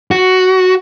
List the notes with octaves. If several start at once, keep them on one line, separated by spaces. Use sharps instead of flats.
F#4